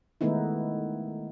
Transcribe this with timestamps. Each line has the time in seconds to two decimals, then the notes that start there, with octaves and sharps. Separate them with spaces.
0.21 D#3 G#3 A3 B3 D#4 E4